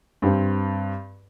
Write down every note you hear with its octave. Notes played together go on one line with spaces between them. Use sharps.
G2 C4